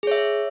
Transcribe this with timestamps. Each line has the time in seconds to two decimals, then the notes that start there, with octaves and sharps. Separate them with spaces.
0.03 G#4
0.07 C#5
0.11 E5